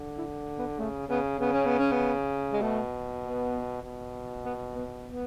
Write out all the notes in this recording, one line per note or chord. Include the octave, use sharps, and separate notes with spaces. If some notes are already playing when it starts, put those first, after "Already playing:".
Already playing: D3
E4
B3
C#3 A3
C#3 B3
C#3 B3
C#4
B3
C#4
B3
G#3
B2 A3
B3
B2
B3
B3
B3